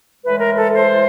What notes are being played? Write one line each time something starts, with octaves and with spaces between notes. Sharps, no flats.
A2 E3 G#3 B4
A#4
A4
C5